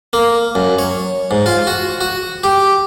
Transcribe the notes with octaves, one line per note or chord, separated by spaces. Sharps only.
A#3
F#2
C#5
G#2
F4
F#4
F#4
G4